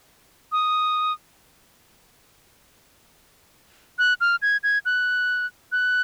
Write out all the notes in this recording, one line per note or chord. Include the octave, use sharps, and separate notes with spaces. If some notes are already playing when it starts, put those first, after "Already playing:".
D#6
F#6
F6
G#6
G#6
F#6
F#6